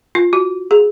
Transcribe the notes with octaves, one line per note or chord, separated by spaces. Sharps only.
F4
F#4
G#4